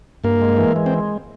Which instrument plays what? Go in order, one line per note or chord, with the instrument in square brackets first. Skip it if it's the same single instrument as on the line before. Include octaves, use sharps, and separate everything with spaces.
[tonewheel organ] G2 [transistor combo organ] A#3
[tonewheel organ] G#3
E3
G#3
[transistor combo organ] C4